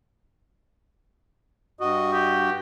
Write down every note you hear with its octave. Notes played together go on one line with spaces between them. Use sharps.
G2 F#4 D#5
G4